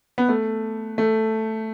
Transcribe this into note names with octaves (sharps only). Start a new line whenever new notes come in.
B3
A3
A3